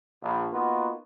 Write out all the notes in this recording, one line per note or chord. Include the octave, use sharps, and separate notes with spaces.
A#1
A#3 B3 D#4 F4 F#4